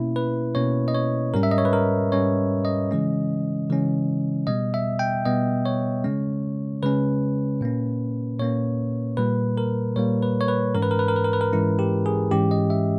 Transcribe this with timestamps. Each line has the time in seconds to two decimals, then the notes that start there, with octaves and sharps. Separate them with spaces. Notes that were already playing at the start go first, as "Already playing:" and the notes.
Already playing: B2 A#3 C#4 E4
0.16 B4
0.55 B2 A#3 C#4 C#5
0.88 D#5
0.95 C#5
1.34 G#2 G3 C#4 A#4
1.43 E5
1.51 D#5
1.58 C#5
1.65 B4
1.73 A#4
2.12 G#2 G3 C#4 C#5
2.65 D#5
2.91 C#3 E3 G#3 C#4
3.70 C#3 E3 G#3 C#4
4.47 B2 G3 B3 D#5
4.74 E5
4.99 G5
5.25 B2 G3 B3 D#5
5.66 C#5
6.04 C#3 G#3 C#4
6.83 C#3 G#3 C#4 B4
7.61 A#2 A#3 C#4
8.39 A#2 A#3 C#4 C#5
9.17 A#2 G3 A#3 B4
9.58 A#4
9.96 A#2 G3 A#3 C#5
10.23 B4
10.41 C#5
10.48 B4
10.74 G#2 E3 G#3 C#4 A#4
10.82 B4
10.91 A#4
10.99 B4
11.08 A#4
11.16 B4
11.24 A#4
11.33 B4
11.41 A#4
11.53 G#2 E3 G#3 C#4 E4
11.79 G4
12.06 G#4
12.31 G#2 E3 G#3 C#4 G4
12.51 D#5
12.70 E5